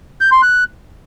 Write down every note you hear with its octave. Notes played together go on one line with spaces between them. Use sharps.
G6
C6
F#6